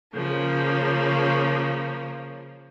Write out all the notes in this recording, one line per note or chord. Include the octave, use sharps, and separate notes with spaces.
C#3 F3 A#3